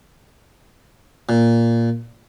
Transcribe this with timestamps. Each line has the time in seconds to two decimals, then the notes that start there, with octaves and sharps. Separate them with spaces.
1.29 A#2